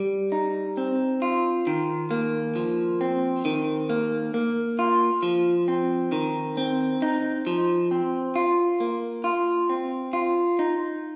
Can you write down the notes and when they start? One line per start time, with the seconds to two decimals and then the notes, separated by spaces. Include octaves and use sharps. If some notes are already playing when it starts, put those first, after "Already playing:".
Already playing: G3
0.32 D#4
0.77 C4
1.22 F4
1.67 D#3
2.11 A#3
2.56 F3
3.01 C4
3.45 D#3
3.89 A#3
4.34 A#3
4.79 F4
5.23 F3
5.68 C4
6.12 D#3
6.57 C4
7.02 D#4
7.47 F3
7.91 C4
8.36 F4
8.80 A#3
9.24 F4
9.69 C4
10.13 F4
10.59 D#4